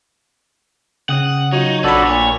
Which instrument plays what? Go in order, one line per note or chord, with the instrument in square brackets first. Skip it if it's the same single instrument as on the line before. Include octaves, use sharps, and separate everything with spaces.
[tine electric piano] C#3 C#4 [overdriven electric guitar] F#5 [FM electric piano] G5 D#6
[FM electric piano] F#3 F4 [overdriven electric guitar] D#4 [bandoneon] C#5
[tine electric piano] A#1 B5 [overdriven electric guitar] C4 B4 [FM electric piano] D4 [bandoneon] F#4 A4 D5
[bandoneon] A#2 [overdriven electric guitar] C#5